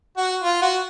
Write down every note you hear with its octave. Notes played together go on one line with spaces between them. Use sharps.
F#4
F4
F#4